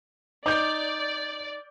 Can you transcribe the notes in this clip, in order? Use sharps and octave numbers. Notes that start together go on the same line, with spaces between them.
D#4 D5 D6 G6